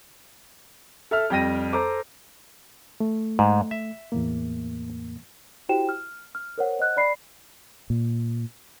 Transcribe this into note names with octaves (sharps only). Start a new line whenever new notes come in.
A4 E5 F6
F2 G3 G5 A#6 D#7
A4 C5 A#5 D6
A3
G#2
E5
E2 A2 A#3
E4 F#4 G4 C5 G5 E7
F6
F6
A#4 C5 C#5 F#5
C5 D#5 F#5 F#6
D5 B5 C7
A#2